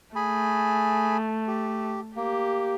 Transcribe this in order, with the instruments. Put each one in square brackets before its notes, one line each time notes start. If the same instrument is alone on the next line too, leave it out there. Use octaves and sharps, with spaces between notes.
[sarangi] A3 [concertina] G#4 G#5 B5
[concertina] G4
[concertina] A#3 [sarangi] G4